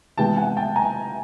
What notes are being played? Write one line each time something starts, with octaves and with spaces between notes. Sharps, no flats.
C3 E3 G#3 B3 G5 A5
F#5 G#5
G5 A5
G#5 A#5